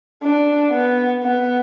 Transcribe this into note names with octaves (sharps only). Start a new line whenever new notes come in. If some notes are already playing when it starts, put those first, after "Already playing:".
D4
B3
B3